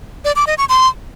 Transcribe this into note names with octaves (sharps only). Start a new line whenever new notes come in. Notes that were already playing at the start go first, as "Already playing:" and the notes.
D5
D6
D#5
C#6
C6